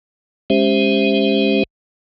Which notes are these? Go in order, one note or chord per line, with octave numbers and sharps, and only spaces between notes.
G#3 C#4 G4 C5 E5